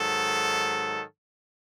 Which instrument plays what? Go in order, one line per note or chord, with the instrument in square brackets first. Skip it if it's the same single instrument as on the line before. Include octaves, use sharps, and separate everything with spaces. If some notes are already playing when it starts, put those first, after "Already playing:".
Already playing: [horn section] G#2 D#3 F#3 A4